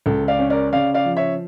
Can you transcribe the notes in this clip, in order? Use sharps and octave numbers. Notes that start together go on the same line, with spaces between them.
C#2 A4
D5 F5
C#4
A#4 D5
C#3 D5 F5
D5 F5
F3
C#5 E5